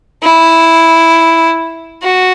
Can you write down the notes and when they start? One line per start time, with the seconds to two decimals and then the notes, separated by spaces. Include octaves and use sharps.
0.23 E4
2.03 F#4